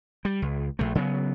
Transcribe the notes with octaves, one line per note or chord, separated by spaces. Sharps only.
G3
C#2
A#1 D#2 A3
C#3 F#3 G#3 B3